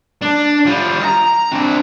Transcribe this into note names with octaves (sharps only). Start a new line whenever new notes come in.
D4
G3 F4
D#5 A#5
C4 D4